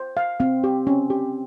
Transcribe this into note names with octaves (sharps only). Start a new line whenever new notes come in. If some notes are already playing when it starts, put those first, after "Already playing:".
Already playing: C5
F5
C4 F5
G4
C#4
G4